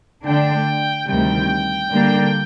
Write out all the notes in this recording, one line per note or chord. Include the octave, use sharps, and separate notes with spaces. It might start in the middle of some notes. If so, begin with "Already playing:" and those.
D3 A3 D4 G5
D2 C3 D#3 G3 G5
D3 G3 A#3 D4